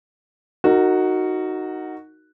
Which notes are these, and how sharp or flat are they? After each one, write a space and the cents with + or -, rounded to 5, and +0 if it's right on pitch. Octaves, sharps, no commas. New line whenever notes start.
D#4 +0 F#4 +0 A#4 -25